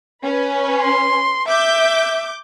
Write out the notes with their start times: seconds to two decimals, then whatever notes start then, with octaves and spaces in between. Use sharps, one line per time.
0.24 C#4 B4
0.81 C6
1.48 E5 D6 G6